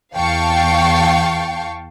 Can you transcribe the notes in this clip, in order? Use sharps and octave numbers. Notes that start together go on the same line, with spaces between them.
E2 F5 G5 A5 C#6